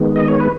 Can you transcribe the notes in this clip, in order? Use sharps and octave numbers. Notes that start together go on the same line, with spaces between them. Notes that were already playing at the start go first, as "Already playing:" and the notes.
Already playing: D#3 G#3 B3
D#5
C#5
B4